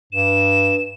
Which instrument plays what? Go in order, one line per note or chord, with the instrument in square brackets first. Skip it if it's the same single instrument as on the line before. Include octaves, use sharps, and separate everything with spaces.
[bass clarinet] G2 [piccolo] E7